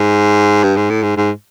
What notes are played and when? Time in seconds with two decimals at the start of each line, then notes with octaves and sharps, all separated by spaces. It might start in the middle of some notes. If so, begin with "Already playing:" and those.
Already playing: G#2
0.63 G2
0.76 G#2
0.90 A2
1.03 G#2
1.17 G#2